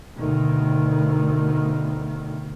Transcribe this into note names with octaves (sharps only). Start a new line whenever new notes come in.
D2 B2 D#3